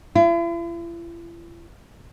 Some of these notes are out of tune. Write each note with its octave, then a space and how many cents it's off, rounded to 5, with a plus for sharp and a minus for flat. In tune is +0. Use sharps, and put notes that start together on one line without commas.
E4 +45